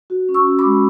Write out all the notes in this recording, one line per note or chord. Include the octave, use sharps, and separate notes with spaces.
F#4
C#4
C#6 E6
F#4
B5 D6
G#3